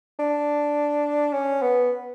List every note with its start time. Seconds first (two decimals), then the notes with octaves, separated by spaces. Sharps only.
0.19 D4
1.33 C#4
1.62 B3